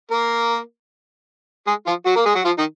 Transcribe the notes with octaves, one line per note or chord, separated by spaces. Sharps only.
A#3 A#4
G#3 G#4
F3 F4
F#3 F#4
A#3 A#4
G#3 G#4
F#3 F#4
F3 F4
D#3 D#4